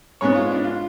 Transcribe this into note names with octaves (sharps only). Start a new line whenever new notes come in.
G#2 G#3 B3 C#5
F4
D4
F4